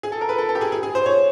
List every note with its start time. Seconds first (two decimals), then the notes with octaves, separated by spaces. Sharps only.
0.03 G#4
0.12 A4
0.21 A#4
0.29 B4
0.38 A4
0.49 A4
0.55 G4
0.61 G#4
0.72 G#4
0.83 G#4
0.95 C5
1.06 C#5